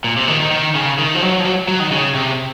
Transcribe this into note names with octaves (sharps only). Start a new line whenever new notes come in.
A#2
C3
D#3
D#3
D#3
C#3
D#3
F3
F#3
F3
F#3
F#3
D#3
C#3
C3